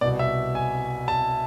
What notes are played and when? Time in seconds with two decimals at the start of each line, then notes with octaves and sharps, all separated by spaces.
0.01 C2 B2 D5
0.19 E5
0.55 G#5
1.08 A5